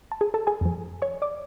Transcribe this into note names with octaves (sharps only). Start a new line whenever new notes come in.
A5
G#4 G#5
A4 A5
G#4 G#5
F2 F3
C#5 C#6
D5 D6